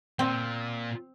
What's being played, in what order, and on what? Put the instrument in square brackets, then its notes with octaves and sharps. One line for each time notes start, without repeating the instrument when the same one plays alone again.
[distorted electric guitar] A#2 [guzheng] C4